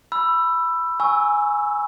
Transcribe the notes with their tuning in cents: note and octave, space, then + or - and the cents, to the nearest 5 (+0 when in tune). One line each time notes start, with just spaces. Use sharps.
B5 +0 E6 +15
G#5 +0 C#6 +0 E6 -15